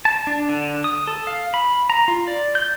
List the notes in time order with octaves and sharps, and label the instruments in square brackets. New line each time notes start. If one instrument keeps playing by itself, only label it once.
[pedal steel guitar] A5
D4
D3
D#6
A4
F5
B5
A#5
F4
D5
G6